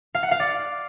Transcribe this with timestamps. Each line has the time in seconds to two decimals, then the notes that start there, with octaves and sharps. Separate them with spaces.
0.15 F5
0.23 F#5
0.31 F5
0.40 D5